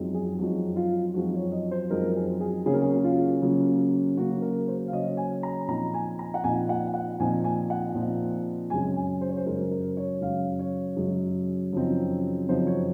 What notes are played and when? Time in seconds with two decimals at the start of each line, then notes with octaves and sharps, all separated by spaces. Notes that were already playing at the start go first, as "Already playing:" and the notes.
Already playing: F#2 F3 G#3 C4 D#4
0.14 G#4
0.39 F#2 F3 G#3 C4 D#4 F#4
0.76 F4
1.14 F#2 F3 G#3 C4 D#4 F#4
1.34 C#5
1.52 D#5
1.71 C5
1.91 F#2 F3 G#3 C4 D#4 A#4
2.16 G#4
2.41 G#4
2.66 C#3 F#3 A#3 C#4 G#4
2.74 A#4
2.82 G#4
3.04 F4
3.42 C#3 F#3 A#3 C#4
4.17 C#3 F#3 A#3 C#4 F#4
4.42 A#4
4.68 C5
4.88 F5
4.92 C#3 F#3 A#3 C#4 D#5
5.17 G#5
5.43 A#5
5.68 A#2 F3 C4 D#4 A#5
5.94 G#5
6.19 A#5
6.34 F#5
6.44 A#2 F3 C4 D#4 G#5
6.69 F#5
6.94 F#5
7.19 A#2 F3 C4 D#4 G#5
7.44 G#5
7.70 F#5
7.95 A#2 F3 C4 D#4
8.70 F#2 C#3 G#3 G#5
8.96 G#5
9.21 C5
9.29 C#5
9.37 C5
9.46 F#2 C#3 G#3 A#4
9.71 A#4
9.97 C#5
10.21 F#2 C#3 G#3 F5
10.59 C#5
10.97 F#2 C#3 G#3
11.73 F#2 C#3 F3 C4 D#4
12.48 F#2 C#3 F3 C4 D#4 C5
12.67 C#5